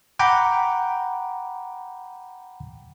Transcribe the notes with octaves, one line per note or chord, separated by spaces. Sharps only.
F#5 G5 A#5 B5 D6 G6